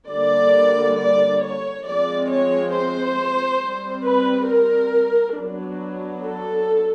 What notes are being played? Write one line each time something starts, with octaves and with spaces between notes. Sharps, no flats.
D3 G3 A#3 D5
D5
C#5
F3 G#3 C4 D5
C#5
C5
G3 C4
B4
A#4
F#3 B3 D4
A4